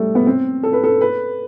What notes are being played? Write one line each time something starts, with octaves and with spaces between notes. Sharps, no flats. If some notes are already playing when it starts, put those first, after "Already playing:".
Already playing: G3 A3
B3
C4
A4
B4
A4
B4